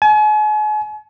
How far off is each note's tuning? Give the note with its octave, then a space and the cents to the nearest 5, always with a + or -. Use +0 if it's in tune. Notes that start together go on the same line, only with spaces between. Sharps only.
G#5 +40